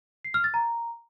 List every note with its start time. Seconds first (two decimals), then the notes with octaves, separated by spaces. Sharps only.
0.25 C7
0.34 F6
0.44 A6
0.54 A#5